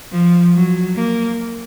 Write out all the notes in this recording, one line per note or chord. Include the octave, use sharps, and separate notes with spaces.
F3
F#3
A#3